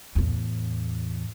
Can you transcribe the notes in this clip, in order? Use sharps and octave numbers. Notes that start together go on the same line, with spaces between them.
E2 A2